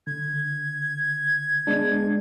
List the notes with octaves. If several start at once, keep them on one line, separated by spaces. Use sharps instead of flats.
D3 G#6
G#3 B3 D4